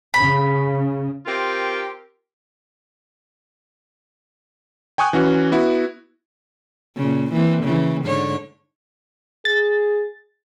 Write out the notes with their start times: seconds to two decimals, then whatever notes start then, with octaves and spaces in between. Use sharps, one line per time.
0.14 C#3 B5
1.26 C4 F4 G4 A#4
4.98 G5 G#5 C#6 D#6 F#6
5.13 E3 C#4 F#4
5.52 B3 E4 F#4
6.97 A#2 C#3
7.33 E3 A#3 C4
7.64 C#3 E3
8.05 G#2 D3 C#5
9.45 G#4 A6